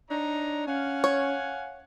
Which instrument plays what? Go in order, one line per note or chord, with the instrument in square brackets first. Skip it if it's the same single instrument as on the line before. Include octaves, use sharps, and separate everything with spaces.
[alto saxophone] D4 [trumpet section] D#4 C#5 A#5
[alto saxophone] C#4 [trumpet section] F5 F#5 G#5
[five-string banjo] C#5